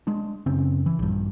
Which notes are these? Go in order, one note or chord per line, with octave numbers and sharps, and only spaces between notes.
G#3 D4
F#1 C#3 C4 C#4
E3
A#1 G2